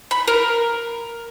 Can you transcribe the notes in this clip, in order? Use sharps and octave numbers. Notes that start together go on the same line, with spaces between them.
B5
A#4